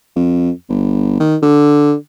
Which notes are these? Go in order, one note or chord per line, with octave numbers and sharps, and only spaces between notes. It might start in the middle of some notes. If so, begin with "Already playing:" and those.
F2
G1
D#3
D3